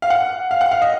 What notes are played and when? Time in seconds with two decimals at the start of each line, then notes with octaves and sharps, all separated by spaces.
0.02 F5
0.10 F#5
0.51 F5
0.61 F#5
0.71 F5
0.82 D#5